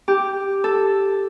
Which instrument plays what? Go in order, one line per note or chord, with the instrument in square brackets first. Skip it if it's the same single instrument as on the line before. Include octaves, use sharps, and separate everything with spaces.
[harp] G4
A4